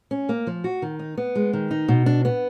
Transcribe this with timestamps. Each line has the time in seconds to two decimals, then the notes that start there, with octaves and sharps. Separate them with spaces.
0.11 C#4
0.29 A#3
0.47 F3
0.64 F#4
0.82 D#3
0.99 D#4
1.17 B3
1.35 G#3
1.53 D#3
1.71 D#4
1.88 B2
2.06 D4
2.25 B3